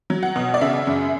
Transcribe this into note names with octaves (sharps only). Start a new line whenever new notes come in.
F#3
F#5
B2
D5
C#3 E5
F#2